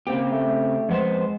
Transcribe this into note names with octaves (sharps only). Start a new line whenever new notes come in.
C#3 A#3 C4 G4
A3
F2 G#3 B3 C5